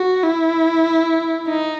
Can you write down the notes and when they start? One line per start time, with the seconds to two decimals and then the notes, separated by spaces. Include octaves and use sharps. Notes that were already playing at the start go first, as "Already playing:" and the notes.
Already playing: F#4
0.23 E4
1.48 D#4